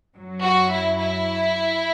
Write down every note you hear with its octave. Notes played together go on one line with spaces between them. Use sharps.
F#2 F#3
F#4
E4
E4